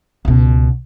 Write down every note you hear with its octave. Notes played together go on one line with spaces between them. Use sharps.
C#2 B2